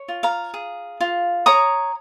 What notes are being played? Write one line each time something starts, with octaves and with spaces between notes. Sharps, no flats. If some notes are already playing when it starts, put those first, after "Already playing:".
Already playing: C#5
F4
F5 A#5
G#4
F4
C#5 A#5 D#6